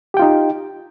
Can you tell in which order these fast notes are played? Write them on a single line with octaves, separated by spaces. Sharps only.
G4 G5 F4 D#4